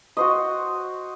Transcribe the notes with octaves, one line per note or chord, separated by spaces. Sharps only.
F#4 C5 D#5